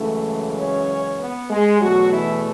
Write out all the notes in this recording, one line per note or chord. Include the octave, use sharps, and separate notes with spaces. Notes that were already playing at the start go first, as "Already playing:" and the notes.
Already playing: F#2 C#3 E3 G#3 A3 A4
C#4 C#5
B3 B4
G#3 G#4
E2 B2 F#3 A3 F#4
E3 E4